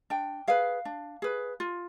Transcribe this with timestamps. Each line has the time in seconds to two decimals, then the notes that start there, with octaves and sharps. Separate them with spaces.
0.10 D4 G5
0.47 G#4 B4 F5
0.85 D4
1.22 G#4 B4
1.60 F4